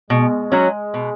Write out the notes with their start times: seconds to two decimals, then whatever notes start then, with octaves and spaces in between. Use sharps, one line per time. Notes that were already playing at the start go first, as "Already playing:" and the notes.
0.10 B2 G#3
0.52 F#3 C#4 F#4
0.94 B2